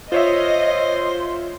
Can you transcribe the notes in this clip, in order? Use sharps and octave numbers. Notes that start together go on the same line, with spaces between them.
F4 C5 C#5 D#5 E5